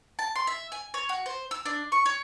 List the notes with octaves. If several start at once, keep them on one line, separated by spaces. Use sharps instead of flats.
A5
C6
E5
G#5
C#5
F#4
C5
E6
D4
C#6
C#5